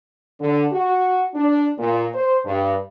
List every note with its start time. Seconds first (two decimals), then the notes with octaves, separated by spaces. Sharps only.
0.40 D3
0.72 F#4
1.34 D4
1.77 A#2
2.14 C5
2.45 G2